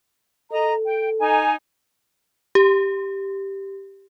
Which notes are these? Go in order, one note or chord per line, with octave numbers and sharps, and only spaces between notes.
A4 D#5 A#5
G5
D#4 G#5
G4